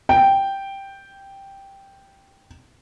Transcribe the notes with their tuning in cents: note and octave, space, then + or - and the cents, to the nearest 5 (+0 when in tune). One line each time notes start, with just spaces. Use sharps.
G5 +0